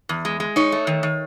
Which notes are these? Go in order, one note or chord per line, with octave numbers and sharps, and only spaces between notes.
E2
G#3
G#3
D#4 C#5
A3
D#3
D#3